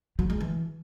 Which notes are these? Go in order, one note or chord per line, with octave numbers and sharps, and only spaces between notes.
F#3
G#3
E3